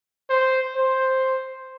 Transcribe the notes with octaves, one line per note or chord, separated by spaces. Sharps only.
C5
C5